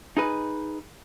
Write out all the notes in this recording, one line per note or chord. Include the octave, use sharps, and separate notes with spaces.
D#4 G#4 B4